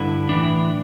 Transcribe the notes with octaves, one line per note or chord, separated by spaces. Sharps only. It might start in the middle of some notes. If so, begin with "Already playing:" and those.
Already playing: G2 D3 E4
A2 E3 D4